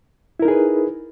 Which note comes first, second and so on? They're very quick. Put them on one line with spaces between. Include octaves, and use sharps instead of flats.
E4 A#4 D#4 G#4 B4